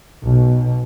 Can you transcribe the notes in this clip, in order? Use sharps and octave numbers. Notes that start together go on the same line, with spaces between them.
B1 B2